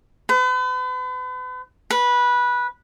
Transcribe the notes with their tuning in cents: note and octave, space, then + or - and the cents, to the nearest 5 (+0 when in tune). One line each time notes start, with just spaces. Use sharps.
B4 +40
B4 -15